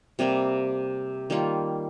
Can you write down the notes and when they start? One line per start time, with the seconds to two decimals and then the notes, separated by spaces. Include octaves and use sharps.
0.19 C3 G3 A#3
1.30 D#3 G3 A#3 F4